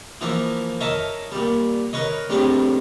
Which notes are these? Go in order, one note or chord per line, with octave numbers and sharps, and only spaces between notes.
E3 F3 A#3 E4
A#4 C#5 D#5 E5 A5
A#2 G3
A#4 B4 C#5 D#5
C#2 A2 C3 G3 D4 G4